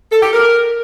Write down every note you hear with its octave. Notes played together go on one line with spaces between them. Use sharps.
A4
G4
A#4